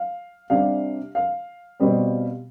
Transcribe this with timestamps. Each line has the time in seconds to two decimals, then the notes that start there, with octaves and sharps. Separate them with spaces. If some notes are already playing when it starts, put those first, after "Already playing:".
Already playing: F5
0.50 C3 G3 D4 F5
1.15 F5
1.80 B2 G3 C4